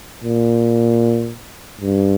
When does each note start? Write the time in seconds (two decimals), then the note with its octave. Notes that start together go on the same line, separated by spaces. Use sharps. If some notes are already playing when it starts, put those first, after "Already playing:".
0.24 A#2
1.81 G2